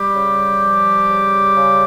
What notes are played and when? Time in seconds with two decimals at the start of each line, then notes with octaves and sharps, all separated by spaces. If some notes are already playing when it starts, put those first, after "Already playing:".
Already playing: G3 G4
0.14 C#3
0.62 F3
1.09 C#3
1.56 C#3